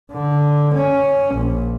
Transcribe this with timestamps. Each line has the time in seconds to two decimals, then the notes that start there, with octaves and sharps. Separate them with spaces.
0.12 D3
0.75 C#4
1.35 A#1